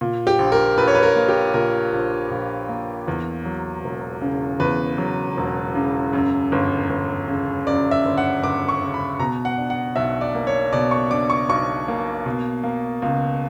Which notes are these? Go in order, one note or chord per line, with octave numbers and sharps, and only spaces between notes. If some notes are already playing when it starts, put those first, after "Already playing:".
A#2
G4
A#1
A#4
A#1 B4
C#5
B4
A#4
A#3
G4
A#2 A#4
A#1
A#1
A#3
E2
F#3
E1
C#3
E2 B4
F#3
E1
C#3
F#2
G1
G1
C#3
F#2 D5
E5
G1
F#5
G1 D6
C#6
C#3
B5
B2 A#5
F#5
D4
F#5
B1 E5
D5
A#3
C#5
B2 D5
C#6
D4 D6
C#6
B1 C#6
A#3
B2
A#3
C#2